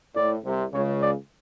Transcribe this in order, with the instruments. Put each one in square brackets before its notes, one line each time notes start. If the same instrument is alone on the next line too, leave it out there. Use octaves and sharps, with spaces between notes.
[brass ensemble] A2 [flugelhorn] D5
[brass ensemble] C2 C3
[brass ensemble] C#2 C#3 [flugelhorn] C#5
[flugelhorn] D5